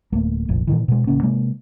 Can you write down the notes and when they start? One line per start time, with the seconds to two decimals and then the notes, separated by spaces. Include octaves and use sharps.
0.12 D1 A3 A#3
0.49 F1 A#1
0.67 A#2 D#3 E3
0.88 B2 G#3
1.07 A1 C#3 A#3 C#4
1.23 C3 G#3 A#3